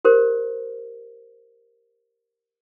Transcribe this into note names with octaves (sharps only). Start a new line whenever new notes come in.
G4 A#4 C5